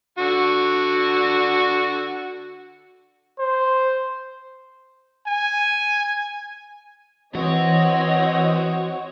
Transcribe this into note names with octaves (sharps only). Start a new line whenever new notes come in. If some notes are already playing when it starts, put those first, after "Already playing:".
D3 F#4
C5
G#5
E3 C4 F#4 C#5 D#5